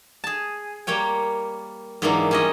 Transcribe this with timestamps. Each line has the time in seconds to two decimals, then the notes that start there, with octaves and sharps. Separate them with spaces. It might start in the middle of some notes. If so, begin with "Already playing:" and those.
0.24 G#4 A5
0.87 G3 A#3 C#5 G5
2.02 G#2 D#3 E3 F#3 A#3 D4
2.31 G3 C#4 D#5